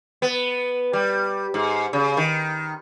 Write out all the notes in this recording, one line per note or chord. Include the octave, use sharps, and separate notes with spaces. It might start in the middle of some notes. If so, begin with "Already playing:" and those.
B3
G3
G#2
C#3
D#3